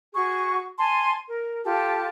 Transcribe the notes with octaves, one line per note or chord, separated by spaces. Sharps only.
F#4 G#4 C#6
G#5 A5 C6
A#4
F4 G4 A4 A5